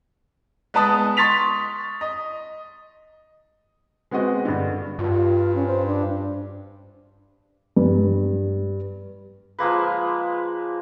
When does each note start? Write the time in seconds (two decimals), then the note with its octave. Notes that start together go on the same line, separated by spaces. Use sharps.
0.74 G#3 B3 B4 A5 D#6
1.17 C6 C#6 A6 B6 F7
2.01 D#5
4.11 G#3 B3 C4 F#4 D#5
4.45 G2 D3
4.99 G2 F4
5.55 C#4
5.67 C5
5.87 D4
7.76 G2
9.59 F3 G#3 A#3 B4